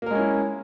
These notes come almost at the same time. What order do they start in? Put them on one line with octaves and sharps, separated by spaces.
A#3 A#4 G#3 C#4 E4